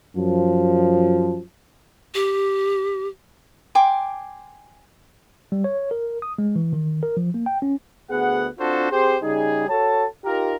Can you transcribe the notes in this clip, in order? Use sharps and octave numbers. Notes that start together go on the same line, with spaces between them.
F#2 F3
G4
G5 G#5 C6 D6
G3
C#5
A#4
D#6
G#3
E3
D#3
A#4
F3
A#3
G5
C#4
D2 B3 G#4 F#5
C4 D4 F4 F#4 A4 C5
C4 G4 G#4 C5
C#3 G3 D#4 G#4
F#4 A4 C#5 A5
D#4 F4 G4 A#4